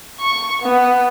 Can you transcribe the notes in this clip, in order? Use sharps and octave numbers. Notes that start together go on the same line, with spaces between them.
C#6
B3